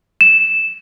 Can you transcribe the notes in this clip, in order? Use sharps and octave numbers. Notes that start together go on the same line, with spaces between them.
E7